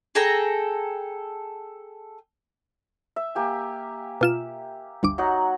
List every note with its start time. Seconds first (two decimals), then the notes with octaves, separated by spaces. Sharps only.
0.15 G#4 A4 G5 A#5
3.16 E5
3.35 A#3 G4 G#5
4.21 B2 F4 E7
5.03 G1 D2 D6
5.18 F#3 D#4 F#5